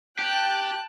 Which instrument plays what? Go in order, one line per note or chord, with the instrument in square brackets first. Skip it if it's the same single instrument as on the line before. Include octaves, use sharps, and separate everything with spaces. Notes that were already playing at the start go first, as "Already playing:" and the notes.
[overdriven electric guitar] G4 [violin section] G5 A5 F#6